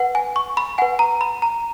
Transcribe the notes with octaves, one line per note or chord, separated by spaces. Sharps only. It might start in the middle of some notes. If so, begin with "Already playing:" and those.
Already playing: B4 F#5
G#5
C#6
B5
B4 F#5 G#5
A#5
B5
A#5